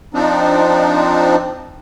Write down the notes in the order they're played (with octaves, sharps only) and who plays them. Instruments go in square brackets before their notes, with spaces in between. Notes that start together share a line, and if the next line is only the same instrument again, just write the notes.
[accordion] F3 C4 D4 D#4